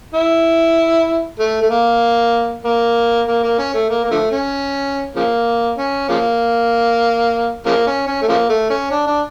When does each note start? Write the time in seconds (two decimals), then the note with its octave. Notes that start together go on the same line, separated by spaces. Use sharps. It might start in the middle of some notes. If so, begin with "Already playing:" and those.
0.14 E4
1.39 A3
1.62 A3
1.71 A#3
2.65 A#3
3.27 A#3
3.43 A#3
3.59 C#4
3.74 A3
3.90 A#3
4.04 A#3
4.11 D3 F3 A3
4.31 C#4
5.15 C#3 F3 A#3
5.78 C#4
6.09 C#3 F3 A#3
7.66 C#3 F3 A#3
7.87 C#4
8.07 C#4
8.22 A3
8.28 C#3 F3 A#3
8.49 A3
8.70 C#4
8.91 D4
9.07 D4